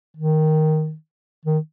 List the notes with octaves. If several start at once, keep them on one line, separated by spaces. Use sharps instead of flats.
D#3
D#3